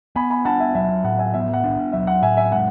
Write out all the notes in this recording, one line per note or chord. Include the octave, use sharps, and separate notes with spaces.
B3 G#5 B5
G#5 B5
D4 F#5 A5
E5 G#5
F#3 E5
A2 F#5
E5 G#5
B3 E5
F#5
D4
F#3 E5
F#5
A2 E5 G#5
E5 G#5
G#3 F#5